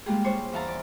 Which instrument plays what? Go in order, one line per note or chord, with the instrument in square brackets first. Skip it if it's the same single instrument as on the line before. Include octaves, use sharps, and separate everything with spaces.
[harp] G3 G#3 A#3 F4 G4 G#4
D4 C5 C#5
E2 E5 F5 A5 A#5
D5